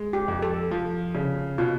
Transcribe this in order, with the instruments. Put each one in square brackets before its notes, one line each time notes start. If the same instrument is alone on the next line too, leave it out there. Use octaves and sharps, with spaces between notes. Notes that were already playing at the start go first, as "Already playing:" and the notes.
Already playing: [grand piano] G#3
[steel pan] G4
[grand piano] F2
[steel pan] A4
[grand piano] F3
C#3
[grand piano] B2 [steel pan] F4